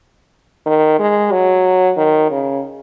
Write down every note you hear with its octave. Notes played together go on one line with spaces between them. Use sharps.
D#3
G#3
F#3
D#3
C#3